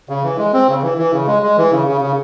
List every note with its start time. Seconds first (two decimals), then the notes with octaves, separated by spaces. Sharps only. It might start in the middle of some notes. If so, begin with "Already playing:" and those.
0.09 C#3
0.23 E3
0.38 G#3
0.53 C4
0.69 C#3
0.83 E3
0.98 E3
1.13 C#3
1.27 G#3
1.43 G#3
1.57 E3
1.71 C#3
1.87 C#3
2.01 C#3